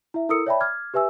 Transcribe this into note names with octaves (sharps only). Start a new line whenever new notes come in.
E4 E5
E4 A4 A#4 D#6 E6 C#7
C#5 D5 E5 G5 A5 B5
D6 F6 G#6
G4 B4 E5 G#5 E6